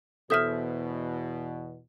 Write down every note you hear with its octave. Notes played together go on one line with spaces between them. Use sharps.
E2 B2 A4 C5 E5 D#6 F6